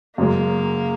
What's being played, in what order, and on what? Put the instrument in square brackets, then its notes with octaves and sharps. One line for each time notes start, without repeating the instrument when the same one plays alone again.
[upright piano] F#2 C#3 G#3 [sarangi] A#3